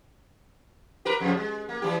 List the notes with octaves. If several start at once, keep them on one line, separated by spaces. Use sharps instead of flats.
G4 A#4 B4
F2 C#3 F3
G#3
A#3
E3 G3 G4